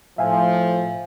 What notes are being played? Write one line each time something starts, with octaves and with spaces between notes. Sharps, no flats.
A2 F3 E5 F5 G#5